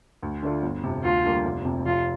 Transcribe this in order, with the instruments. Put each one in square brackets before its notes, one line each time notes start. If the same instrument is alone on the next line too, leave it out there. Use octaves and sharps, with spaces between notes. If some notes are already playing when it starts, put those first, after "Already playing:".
[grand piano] D2
D3 A3 D4 F4
G1
F2 C3
[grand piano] D2 [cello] F4
[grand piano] D3 G3 A#3
F1
F2 C3
[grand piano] F1 [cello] F4